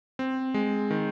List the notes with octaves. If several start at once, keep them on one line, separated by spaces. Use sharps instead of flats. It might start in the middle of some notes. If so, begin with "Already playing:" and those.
C4
G#3
D#3